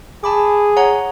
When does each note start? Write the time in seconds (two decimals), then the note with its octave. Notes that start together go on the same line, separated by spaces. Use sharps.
0.24 G#4 A5 B5 D6
0.77 C#5 F#5 A#5